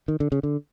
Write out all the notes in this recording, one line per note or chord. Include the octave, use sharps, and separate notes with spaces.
D#3
D3
C#3
D3